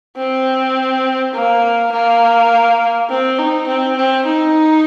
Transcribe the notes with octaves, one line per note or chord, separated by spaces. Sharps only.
C4
A#3
A#3
C4
D#4
C4
C4
D#4